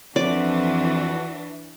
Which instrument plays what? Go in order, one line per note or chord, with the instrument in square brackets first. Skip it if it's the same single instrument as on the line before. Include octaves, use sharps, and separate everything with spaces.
[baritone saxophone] F2 [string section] E3 D4 [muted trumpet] F#4 [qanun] D5